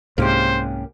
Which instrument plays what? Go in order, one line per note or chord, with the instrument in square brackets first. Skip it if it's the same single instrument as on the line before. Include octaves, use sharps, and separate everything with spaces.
[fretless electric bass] C2 G#2 [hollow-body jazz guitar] A#3 C#4 G4 [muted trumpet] C5